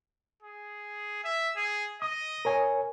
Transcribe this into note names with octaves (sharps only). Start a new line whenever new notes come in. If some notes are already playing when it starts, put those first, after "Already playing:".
G#4
E5
G#4
D#5 D#6
A#4 C#5 G#5